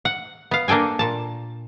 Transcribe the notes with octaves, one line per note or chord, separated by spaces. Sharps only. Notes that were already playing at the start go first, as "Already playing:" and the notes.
F#5
B3 F5
A#3 D4 A4 G5 G#5
A#2 A5